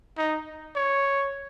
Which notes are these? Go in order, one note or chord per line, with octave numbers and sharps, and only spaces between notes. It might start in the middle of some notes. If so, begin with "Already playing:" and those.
D#4
C#5